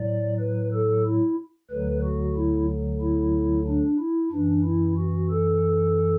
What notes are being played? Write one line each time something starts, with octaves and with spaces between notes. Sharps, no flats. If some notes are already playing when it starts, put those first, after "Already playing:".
Already playing: A2 F#3 D5
B4
A4
E4
D2 D3 F#3 B4
F#4
E4
E4
D4
E4
F#2 E3 D4
E4
F#4
A4